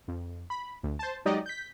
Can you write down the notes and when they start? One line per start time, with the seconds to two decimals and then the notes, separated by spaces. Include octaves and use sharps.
0.08 F2
0.50 B5
0.83 D2
0.99 C5 A5
1.25 F#3 G#3 D#4 G4 D5 D#5
1.46 G6 B6